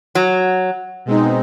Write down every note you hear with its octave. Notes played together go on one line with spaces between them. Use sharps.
F#3
B2 G#3 C4 D#4